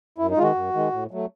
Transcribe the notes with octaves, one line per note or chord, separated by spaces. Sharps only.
F#2 E4
D#4
D#3 G#3 F4 F#4
F#2
D#3 G#3
A2
F#3 A3